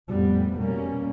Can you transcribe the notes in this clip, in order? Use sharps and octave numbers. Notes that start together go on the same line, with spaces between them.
F1 F2 A2 G3 B3
B2 G3 A#3 C#4